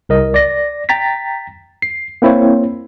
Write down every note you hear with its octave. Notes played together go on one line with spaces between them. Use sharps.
C2 A#4 D#5
D5 A#6
G5 A#5 A6 B6
C7
A#3 C4 E4 C5 C#5